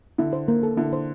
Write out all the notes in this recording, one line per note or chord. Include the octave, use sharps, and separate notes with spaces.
D3 E4
C5
A#3
A4
D3 E4
C5